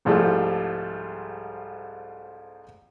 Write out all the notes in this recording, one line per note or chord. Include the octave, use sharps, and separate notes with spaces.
C2 G#2 F3 G3 A3